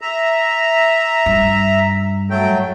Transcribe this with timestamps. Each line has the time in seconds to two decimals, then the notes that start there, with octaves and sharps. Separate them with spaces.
0.01 E5 A#5
1.26 G2
2.30 F#3 A3 G5